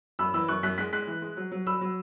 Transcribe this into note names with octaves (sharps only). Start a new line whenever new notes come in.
F#2 B5 E6
E3 B5 E6
F#2 C#6 F#6
F#2 F#6 B6
G#3 F#6 B6
G#3 F#6 B6
E3
G#3
F#3
F#3
F#3 B5 E6
F#3